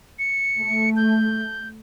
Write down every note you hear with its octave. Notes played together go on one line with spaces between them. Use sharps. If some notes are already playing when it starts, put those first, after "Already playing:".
C#7
A3
G6